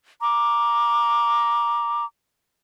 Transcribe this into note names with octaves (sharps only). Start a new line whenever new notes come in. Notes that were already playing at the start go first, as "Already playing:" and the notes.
A#5 D6